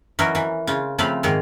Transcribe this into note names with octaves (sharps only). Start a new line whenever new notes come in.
E3 F#3 C#4 D#4 A#4
E3
C#3 F4
C#3 F3 A3 C4 F5 B5
G#2 D#3 G#4 F5 C6